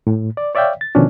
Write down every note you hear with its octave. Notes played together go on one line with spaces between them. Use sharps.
A2
D5
C#5 D5 E5 F5 G5
A6
B2 D3 D#3 F3 C#4 D4